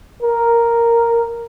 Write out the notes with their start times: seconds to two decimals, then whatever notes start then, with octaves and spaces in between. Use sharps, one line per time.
0.22 A#4